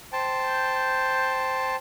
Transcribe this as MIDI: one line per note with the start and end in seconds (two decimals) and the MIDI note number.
0.13 1.76 72
0.13 1.76 79
0.13 1.76 81